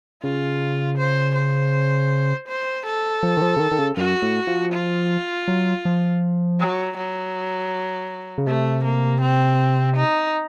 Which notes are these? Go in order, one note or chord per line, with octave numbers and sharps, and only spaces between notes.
C#3 F4
C5
C5
C5
A4
F3
D#3
F3
C#3
D#3
D#3
C#3
F#2 F#4
A2
F3
F4
F#3
F3
F#3
F#3
C#3
C3 A3
A#3
C4
D#4